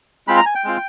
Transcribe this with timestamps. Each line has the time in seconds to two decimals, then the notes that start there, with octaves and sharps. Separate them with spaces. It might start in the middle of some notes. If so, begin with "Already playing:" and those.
0.27 G#3 C4 F4 B5
0.37 A#5
0.46 G#5
0.55 G5
0.64 G#3 C4 F4